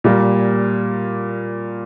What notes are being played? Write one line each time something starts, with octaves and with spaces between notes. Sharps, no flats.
A#2 G3 A#3